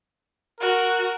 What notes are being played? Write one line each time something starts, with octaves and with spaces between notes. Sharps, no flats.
F#4 A#4